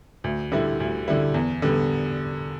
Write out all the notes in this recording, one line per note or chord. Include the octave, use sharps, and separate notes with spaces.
D2
D3 G3 E4
D2
D3 G3 E4
E2
D3 G3 B3